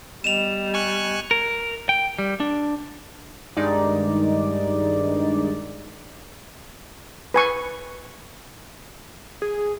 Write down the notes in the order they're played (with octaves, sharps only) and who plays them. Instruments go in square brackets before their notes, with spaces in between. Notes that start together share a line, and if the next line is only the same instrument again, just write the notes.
[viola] G3 [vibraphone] B3 D#5 G5 [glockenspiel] E7 F7
[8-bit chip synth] G#5 C#6 F#6
[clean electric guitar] A#4
G5
G3
D4
[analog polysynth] G2 D#3 G#3 D#4 D5
[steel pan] B4 G#5 C#6
[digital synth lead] G#4